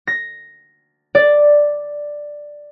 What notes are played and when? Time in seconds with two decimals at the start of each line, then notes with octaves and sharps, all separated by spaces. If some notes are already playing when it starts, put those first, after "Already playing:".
0.07 A#6
1.15 D5